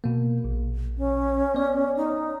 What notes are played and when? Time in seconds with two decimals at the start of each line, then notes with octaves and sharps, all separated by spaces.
0.04 B2 A#3
0.44 A#1
0.98 C#4
1.55 B3 D5
1.97 D#4